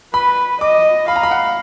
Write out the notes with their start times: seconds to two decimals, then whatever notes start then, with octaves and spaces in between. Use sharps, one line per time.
0.14 B4 B5
0.61 D#5 D6
1.08 F5 B5
1.16 A#5
1.23 B5
1.31 F#5